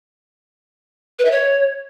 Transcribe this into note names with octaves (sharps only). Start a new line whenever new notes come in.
B4
E5
C#5